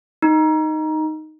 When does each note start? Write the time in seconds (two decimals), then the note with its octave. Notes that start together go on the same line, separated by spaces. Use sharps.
0.22 D#4